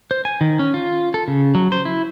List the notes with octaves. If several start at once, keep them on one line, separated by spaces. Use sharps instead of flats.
C5
G#5
D#3
C#4
F4
A4
C#3
F#3
C5
E4